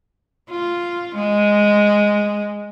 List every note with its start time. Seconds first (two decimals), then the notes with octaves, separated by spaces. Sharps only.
0.49 F4
1.15 G#3